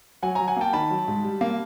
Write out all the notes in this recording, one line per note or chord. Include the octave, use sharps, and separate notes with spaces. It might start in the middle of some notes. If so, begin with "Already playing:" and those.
F#3 F#5 G#5
G#5 A#5
F#3
F#5 G#5
A#3 G5 A5
D#3 A5 B5
F#3
G#2
G3
A#3